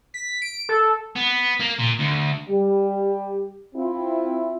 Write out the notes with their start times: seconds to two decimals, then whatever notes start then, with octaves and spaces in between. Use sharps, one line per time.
0.14 B6
0.42 D7
0.69 A4
1.16 B3
1.60 A#3
1.79 A#2
1.99 D2
2.49 G3 G4
3.75 C4 E4 F4